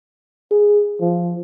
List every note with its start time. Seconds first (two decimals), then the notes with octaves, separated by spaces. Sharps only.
0.51 G#4
1.00 F3